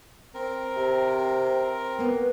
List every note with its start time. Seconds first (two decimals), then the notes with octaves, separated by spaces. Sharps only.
0.34 C4 A#4
0.76 C3
1.99 A#3 B3